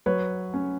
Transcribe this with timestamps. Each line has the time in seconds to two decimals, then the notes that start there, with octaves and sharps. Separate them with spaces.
0.06 F#3 B4 C#5
0.54 C#4